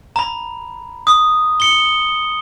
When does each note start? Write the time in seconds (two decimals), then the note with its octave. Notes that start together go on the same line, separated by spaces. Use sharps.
0.16 A#5 B5
1.07 D#6
1.60 C#7 G7